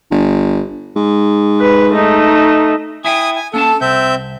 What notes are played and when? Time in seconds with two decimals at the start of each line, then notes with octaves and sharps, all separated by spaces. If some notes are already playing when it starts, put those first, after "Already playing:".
0.11 G1
0.96 G#2
1.61 B4
1.92 A3 D#4
3.05 E4 E5 G5 G#5 D#6
3.36 G#5
3.54 A#3 C#4 A4 A5
3.81 C2 C4 E5 G6